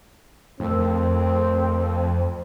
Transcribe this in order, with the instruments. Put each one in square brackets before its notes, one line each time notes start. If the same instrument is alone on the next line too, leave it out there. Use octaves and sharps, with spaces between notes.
[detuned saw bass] F2 [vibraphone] A3 A#4 E6 [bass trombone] C4